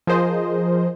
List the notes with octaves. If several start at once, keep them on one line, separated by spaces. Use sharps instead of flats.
F3 G#4 A#4 C5 D#5